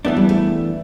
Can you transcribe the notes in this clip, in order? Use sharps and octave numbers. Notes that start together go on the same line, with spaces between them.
E3 A3 B3 D4
G3
A3